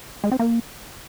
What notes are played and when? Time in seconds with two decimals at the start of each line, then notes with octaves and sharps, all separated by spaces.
0.24 G#3
0.32 C4
0.39 A#3